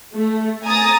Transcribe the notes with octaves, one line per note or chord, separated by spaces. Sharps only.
A3
G#5 A#5 D#6 A6